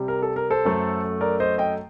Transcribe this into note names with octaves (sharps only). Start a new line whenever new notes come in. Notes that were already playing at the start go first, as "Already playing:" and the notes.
Already playing: C3 G3
A#4
A4
A#4
A4 C5
F#2 F#3 A3
A#4 D5
C5 D#5
D#5 G5